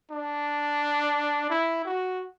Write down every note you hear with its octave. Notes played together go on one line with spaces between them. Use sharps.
D4
E4
F#4